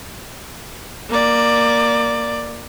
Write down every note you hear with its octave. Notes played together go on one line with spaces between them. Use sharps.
A#3 D5